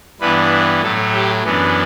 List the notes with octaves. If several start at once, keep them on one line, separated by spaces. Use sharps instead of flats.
G2 E3 B3 D4 B4
A2 F#3 A3 A4
G4
F#2 E3 B3 D4